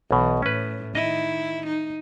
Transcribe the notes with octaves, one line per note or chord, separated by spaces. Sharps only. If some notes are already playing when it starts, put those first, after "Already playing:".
B1 B2 E3
A2 C#4 B4
D#3 E4 D#5
D#4